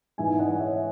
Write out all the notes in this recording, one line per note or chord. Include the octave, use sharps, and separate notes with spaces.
G#2 E3 G#3 B3 D#4 E5 G#5
D#5 F#5
C#5 E5